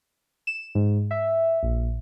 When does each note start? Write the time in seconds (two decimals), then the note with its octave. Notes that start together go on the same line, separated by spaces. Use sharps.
0.47 E7
0.75 G#2
1.11 E5
1.63 A#1